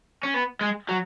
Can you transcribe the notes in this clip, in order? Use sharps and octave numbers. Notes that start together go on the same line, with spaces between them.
C#4
B3
G#3
F#3